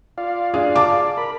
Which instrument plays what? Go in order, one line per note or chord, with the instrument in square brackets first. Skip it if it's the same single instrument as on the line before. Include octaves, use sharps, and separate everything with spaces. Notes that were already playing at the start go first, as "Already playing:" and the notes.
[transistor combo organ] F4 D5 F5
[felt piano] D4 G#4
A5 D6
[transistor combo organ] A#4 B5